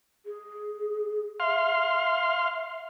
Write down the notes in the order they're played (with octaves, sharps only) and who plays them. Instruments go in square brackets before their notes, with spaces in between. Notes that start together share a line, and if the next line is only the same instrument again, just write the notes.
[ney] G#4
[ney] E5 [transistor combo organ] F5 C6